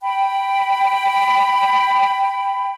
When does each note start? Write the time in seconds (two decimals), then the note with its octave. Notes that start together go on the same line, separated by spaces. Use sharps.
0.01 G5 B5